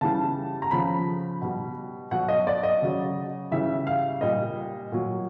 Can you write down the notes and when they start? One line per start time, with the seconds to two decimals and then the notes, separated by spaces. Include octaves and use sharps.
0.01 C#3 E3 G3 A5
0.62 A#5
0.71 C#3 F3 B5
1.42 B2 G3
2.11 B2 F#3 F#5
2.28 D#5
2.47 D5
2.63 D#5
2.82 C#3 F#3
3.51 C#3 E3 G3 E5
3.87 F5
4.21 A#2 G3 D#5
4.92 A#2 F#3